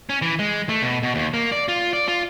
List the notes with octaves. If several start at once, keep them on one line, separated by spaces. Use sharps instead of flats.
C#4
E3
G#3
A3
B2
B2
D#2
A#3
D5
F4
D5
F4